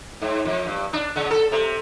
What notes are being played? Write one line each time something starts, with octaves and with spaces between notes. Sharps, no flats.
G#2
F2
G2
D4
C#3
A4
C3